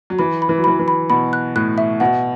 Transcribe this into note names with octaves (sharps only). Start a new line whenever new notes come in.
F#3
E3 B5
B5
E3
F#3
E3 B5
E3
B5
B2 B5
F#6
A2 F#6
E5
B2 F#5